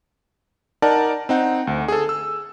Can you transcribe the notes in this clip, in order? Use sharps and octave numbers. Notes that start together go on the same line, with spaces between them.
D#4 A#4 D5 F#5 A5
C4 D#4 F#5
D2
G#4 A4
E6